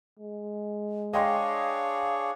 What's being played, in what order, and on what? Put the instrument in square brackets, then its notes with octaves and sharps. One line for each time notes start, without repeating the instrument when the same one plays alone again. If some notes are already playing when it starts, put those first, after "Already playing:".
[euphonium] G#3
[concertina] D4 G#4 C#5 [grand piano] D#5 G5 C6 [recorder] F5